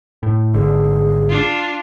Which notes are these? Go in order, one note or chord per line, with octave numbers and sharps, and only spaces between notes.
A2
G#1 D3 G#4
D4 F4